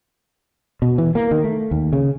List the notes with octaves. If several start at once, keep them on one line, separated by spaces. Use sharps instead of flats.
B2
E3
A#3
D#3
A3
D#2
C#3